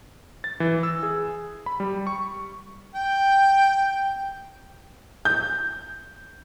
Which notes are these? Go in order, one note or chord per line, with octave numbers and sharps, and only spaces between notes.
A6
E3
E6
G#4
B5
G3
C#6
G5
G6